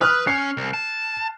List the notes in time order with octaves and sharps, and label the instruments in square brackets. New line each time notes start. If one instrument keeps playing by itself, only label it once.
[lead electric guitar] B4 [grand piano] D#6 F6 F#6
[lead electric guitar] C#4 [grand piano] C7
[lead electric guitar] C2
A5